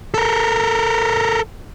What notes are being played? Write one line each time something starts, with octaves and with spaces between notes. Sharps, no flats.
A4 A#4